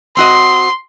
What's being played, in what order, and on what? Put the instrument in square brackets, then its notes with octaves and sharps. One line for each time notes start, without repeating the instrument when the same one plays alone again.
[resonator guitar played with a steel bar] C4 F#4 D#5 [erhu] C6